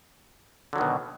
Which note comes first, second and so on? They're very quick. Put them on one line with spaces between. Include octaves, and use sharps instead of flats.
D3 F#3 D#3 B2